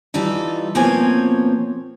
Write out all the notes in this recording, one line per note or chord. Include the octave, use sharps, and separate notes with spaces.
E3 G3 D#4 F4 A4
B2 F3 A#3 C4 C#5 G#5